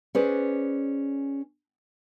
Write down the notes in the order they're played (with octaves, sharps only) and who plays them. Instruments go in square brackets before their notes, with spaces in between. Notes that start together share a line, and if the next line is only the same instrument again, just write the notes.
[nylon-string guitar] C#4 G#4 B4 C5 D5